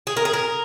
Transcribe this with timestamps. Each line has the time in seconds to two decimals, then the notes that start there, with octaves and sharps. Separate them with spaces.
0.07 G#4
0.17 A#4
0.25 G#4
0.33 A#4